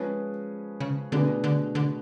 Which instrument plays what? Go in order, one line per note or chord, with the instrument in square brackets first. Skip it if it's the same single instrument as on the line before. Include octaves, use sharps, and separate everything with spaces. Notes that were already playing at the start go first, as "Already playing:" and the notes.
Already playing: [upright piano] F3 G#3 C#4 G#4 B4
[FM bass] C#3
[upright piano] B2 A3 D4 G#4 B4 [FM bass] D3
[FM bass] D3
D3